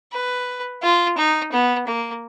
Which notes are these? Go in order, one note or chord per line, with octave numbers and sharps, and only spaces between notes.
B4
F4
D#4
B3
A#3